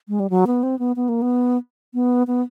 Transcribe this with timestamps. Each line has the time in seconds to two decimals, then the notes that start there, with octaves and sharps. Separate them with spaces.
0.09 G#3
0.20 G3
0.30 F#3
0.47 B3
0.63 C4
0.79 B3
0.96 B3
1.09 A#3
1.22 B3
1.94 B3
2.27 B3